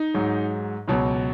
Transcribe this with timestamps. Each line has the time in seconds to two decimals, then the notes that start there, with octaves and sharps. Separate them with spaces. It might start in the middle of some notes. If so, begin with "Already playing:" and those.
Already playing: D#4
0.14 G#2 F#3
0.88 C#2 B2 F#3